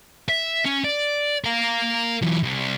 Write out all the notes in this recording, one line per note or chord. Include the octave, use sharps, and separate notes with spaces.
E5
C#4
D5
A#4 F5
E3 F#3
C2